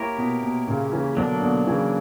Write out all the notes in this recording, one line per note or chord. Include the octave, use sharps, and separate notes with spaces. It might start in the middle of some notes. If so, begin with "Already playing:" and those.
Already playing: A#3 E4 G4 A#4 C#5
B2
B2
A#2 C#3
C#3 E3
B2 D3 F#3 A#3 D4
B2 D3
C#3 E3